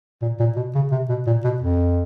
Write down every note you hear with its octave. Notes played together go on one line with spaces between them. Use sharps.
A#2
A#2
B2
C#3
C3
B2
A#2
B2
F2